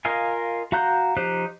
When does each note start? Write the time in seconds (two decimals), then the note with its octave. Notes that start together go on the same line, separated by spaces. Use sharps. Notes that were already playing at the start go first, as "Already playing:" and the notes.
0.05 F4 A#4 D#5 F5 G#5
0.72 F#4 F5 A#5 F#6 G6
1.17 F3 D#4 G4 C5 F#6